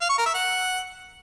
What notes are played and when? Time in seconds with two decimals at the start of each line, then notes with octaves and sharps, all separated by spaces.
0.01 F5
0.10 C#6
0.18 A#4
0.26 E5
0.34 F#5